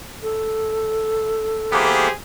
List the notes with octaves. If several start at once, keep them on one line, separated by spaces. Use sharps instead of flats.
A4
E3 A#3 B3 G4 G#4 C5